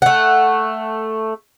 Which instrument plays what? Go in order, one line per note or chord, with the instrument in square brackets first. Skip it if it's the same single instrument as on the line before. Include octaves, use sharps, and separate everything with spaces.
[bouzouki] A3 F#5